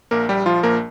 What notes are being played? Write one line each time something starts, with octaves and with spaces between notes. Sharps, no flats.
A#1 A#3 A#4
A#1 G3 G4
F3 F4
A#1 A#3 A#4